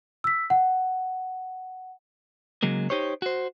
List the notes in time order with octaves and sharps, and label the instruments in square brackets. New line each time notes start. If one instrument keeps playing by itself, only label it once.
[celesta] E6 B6
F#5
[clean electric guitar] C#3 F#3 G#3 A#3
D#4 G4 C5 C#5
F#4 C5